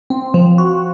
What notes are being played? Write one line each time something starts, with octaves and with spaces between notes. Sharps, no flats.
C4
F3
F#4